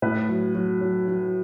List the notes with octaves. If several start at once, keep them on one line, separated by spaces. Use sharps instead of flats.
A2 B4
F#3
F#3
F#3
F#3